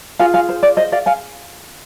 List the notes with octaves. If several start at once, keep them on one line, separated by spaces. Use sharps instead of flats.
F4 G#4 F5 G#5
F5 G#5
C5
D5
C5 D#5
D5 F5
F5 G#5